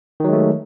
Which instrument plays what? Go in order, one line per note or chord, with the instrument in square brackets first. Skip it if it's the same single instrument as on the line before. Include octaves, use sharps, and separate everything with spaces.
[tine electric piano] D#3
F#3
G#3
A3